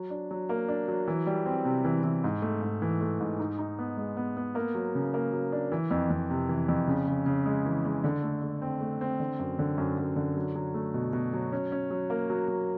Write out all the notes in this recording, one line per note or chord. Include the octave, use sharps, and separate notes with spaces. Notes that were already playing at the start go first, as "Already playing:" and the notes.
Already playing: F#3
D4
F#3
A#3
D4
F#3
E3
G3
C4
C3
E3
E3
G#2
A3
G#2
E3
A3
G#2
D#4
D#4
B3
G#3
B3
B3
A#3
F#3
C#3
A#3
F#3
D4
E3
F2
F2
C3
E3
F2
C#3
C#3
C#3
G#3
E3
G#3
D3
A3
A3
C4
A3
C4
D3
F#2
D3
F#2
F#2
D3
F#3
F#3
A3
B2
B2
F#3
C#4
C#4
F#3
A#3
F#3
F#3